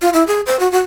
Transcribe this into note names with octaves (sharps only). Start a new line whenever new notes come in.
F4
E4
G#4
C5
F#4
F#4